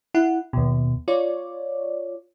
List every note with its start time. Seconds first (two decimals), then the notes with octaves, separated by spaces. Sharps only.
0.14 E4 F#5
0.53 D#2 B2
1.08 F4 C#5 D5